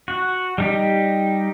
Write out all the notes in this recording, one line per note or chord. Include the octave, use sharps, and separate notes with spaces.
F#4
G3 D#4 G4